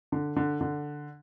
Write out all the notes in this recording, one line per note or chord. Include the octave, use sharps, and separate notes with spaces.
D3
D3
D3